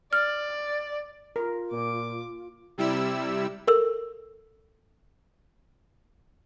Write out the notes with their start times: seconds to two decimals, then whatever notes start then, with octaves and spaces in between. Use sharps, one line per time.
0.13 D5 F6
1.36 F4 A#4
1.72 A#2 D6
2.78 C3 G3 E4 E6
3.67 A4 A#4 E6